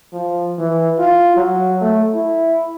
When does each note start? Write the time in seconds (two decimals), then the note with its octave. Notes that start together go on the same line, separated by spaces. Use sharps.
0.13 F3
0.59 E3
0.99 F4
1.36 F#3
1.81 A3
2.14 E4